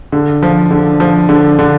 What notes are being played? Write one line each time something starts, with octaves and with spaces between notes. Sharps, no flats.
D3
F3
D3
F3
D3
D3